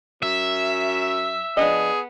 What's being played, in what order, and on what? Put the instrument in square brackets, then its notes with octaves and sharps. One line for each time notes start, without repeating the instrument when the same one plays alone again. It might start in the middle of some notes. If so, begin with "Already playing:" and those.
[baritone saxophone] F#2 [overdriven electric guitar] E5
[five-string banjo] F3 D4 D#5 [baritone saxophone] B3 [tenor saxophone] G#4